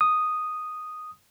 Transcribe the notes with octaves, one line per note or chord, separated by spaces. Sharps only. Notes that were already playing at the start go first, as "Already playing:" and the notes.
D#6